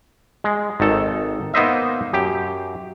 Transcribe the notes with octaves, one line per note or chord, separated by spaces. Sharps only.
G#3
G#1 D#3 A4
A#3 B3 D#4 C5 D#5 E5
F#2 G4